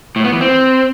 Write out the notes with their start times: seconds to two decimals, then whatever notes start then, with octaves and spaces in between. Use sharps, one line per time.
0.16 A2
0.24 B3
0.33 E3
0.41 C4